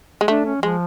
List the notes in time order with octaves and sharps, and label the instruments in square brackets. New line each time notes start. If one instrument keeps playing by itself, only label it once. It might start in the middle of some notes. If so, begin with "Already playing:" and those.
[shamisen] G#3
[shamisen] A3 [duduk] D4
[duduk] C#4
[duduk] F3 [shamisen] G#3